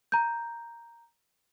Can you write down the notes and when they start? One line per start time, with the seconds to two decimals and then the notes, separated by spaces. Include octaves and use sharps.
0.12 A#5 G6